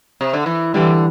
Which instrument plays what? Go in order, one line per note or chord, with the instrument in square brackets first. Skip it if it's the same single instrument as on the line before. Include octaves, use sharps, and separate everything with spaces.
[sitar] C3
D3
E3
[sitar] D3 [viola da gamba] E3 G3